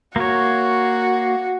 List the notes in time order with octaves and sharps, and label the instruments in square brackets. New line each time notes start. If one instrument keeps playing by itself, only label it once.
[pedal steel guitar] A#3 C#5 [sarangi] F#4